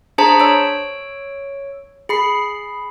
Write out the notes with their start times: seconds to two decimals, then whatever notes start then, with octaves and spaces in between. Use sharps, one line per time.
0.18 D4 G#4 C5 A5 A#5 B6
0.40 C#5 E6 D7
2.09 G#4 B5 C7